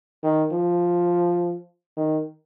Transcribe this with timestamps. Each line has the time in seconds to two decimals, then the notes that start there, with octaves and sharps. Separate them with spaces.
0.23 D#3
0.52 F3
1.97 D#3